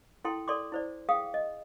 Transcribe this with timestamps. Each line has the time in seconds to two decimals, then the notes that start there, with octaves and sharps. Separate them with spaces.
0.25 E4 A4 G5 C6
0.48 A4 D5 C6 D6
0.72 E4 C5 D5
1.09 G#4 F5 G5 D#6
1.34 D#5